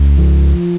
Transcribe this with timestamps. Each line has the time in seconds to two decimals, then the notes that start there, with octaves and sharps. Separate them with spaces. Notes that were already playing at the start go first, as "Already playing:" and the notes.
Already playing: C#2
0.18 F3